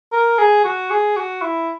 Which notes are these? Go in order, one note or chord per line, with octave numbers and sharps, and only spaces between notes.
A#4
G#4
F#4
G#4
F#4
E4